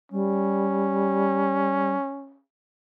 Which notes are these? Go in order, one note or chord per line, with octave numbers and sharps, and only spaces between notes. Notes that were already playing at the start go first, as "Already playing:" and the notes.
G3 C#4